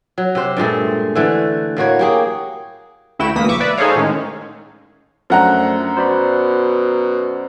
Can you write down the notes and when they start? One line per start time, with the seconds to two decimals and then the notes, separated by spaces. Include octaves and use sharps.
0.18 F#3
0.35 C3 G4 C5
0.57 G2 A#2 G#3 A3
1.15 D3 E3 A3
1.77 A2 A#3 F#4 C#5
1.99 A#3 G4 G#4
3.19 D2 E4 F#4 G5 E7
3.35 D2 E3 A#3 D#6 B6
3.48 B1 E5 C#6 D6
3.60 B4 D5 E5
3.77 D#4 G#4 A4 C5 C#5 F5
3.96 A2 D#3 G#3 C#4
5.30 F#2 F3 A3 D4 F#5 A#5
5.97 B2 C5 D5 B5